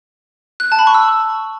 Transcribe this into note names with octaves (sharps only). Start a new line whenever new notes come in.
F#6
A5
B5
C#6
E6